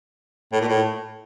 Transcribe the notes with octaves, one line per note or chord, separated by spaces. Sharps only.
A2
A#2
A2